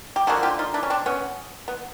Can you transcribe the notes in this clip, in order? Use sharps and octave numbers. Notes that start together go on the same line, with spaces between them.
G4
D3 F3 A#3 F#4 G#4
F4 G4
D#4 F4
D4 E4
C#4
C4 D4
B3 C#4
B3